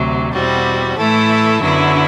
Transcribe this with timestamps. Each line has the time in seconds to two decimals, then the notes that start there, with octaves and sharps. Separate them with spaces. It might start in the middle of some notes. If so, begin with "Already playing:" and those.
Already playing: D2 C3 F#3
0.33 E2 B2 G3 C4 F#4
0.98 A2 E3 A3 E4 A4
1.61 F#2 D3 F#3 B3 E4